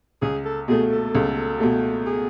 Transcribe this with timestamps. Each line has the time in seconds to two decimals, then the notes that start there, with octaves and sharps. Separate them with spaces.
0.22 C#2 G#4
0.45 A4
0.68 B2 A3 G#4
0.91 A4
1.15 C#2
1.60 B2 A3
2.07 G#4